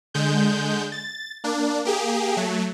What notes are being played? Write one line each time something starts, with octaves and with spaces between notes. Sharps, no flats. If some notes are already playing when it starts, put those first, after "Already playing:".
D3 G#3 G6
A6
A#3 D4
A#3 G4 G#4
F#3 A3